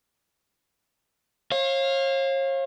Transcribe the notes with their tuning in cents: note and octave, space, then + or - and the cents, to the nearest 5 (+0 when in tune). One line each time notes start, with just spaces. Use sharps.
C#5 -40 F5 +0